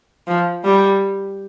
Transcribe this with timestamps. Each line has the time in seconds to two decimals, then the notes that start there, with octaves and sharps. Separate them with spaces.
0.27 F3
0.64 G3